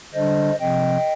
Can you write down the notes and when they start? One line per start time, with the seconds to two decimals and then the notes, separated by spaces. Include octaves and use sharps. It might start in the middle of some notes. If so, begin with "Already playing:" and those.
0.14 D3 G3 D4 C5 D#5
0.60 C3 F3 C4 D#5 G5